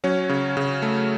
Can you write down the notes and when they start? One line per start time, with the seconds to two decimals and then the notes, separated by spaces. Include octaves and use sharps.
0.04 F#3 C#4 C#5
0.29 C#3
0.57 C#3
0.82 A3